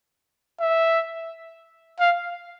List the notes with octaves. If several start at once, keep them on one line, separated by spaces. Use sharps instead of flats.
E5
F5